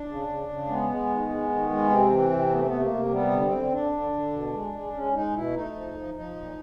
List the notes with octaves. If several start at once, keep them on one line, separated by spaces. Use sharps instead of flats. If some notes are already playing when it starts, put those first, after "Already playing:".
Already playing: D4
C#3
C#3
C#3
G#3 B3
G#3
D#3
G#3
D#3
G#3
C3 C4
E3
C3
A3 B3
C4
C3 B3
A#3
C3
G3 B3
D3
C4
D3
D3 D4
D3
D3
B2
G#3
G#3
G#3 C#4
G#3 D#4
B2 E4
A3 D#4
F3
F3
F3 D#4
A#2